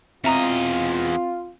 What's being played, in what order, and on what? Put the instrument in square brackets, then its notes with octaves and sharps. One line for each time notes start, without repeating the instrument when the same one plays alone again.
[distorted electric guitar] E2 D#5 [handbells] C4 [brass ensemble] F4 [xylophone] E5 A#5